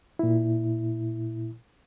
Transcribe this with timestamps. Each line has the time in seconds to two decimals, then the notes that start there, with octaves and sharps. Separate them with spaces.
0.19 A#2 E4